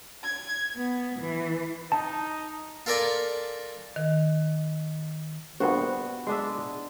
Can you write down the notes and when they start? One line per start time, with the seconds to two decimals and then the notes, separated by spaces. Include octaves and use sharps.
0.24 G#6
0.75 B3
1.18 E3
1.92 D#4 A5
2.86 F4 A4 A#4 D5 G#5 B5
3.96 D#3
5.60 A#1 G2 B3 F#4 C5
6.27 G#3 D4 E5